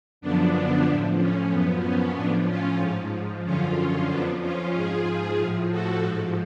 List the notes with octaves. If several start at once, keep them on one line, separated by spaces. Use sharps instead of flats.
F#2 D3 F3 B3 D4
A2 F3
C#4
F#2 F3 B3
C#4
A2 F3 B3 D4
C#4 F4
G#2 F3
F#2 D3 F3 C#4 F4
C#4 F4
F2 F3 B3 D4
C#4 F4
G#2 F3 F4 G#4
A2 F3
F#4 A4
G#2 F3